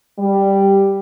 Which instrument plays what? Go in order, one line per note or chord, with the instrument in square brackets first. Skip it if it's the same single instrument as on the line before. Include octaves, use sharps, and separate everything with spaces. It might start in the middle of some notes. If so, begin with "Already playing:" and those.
[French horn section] G3